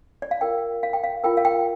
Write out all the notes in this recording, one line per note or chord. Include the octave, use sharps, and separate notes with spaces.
D5
F5
F4 A#4 G5
F5
G5
F5
F4 A#4 G5
F5
G5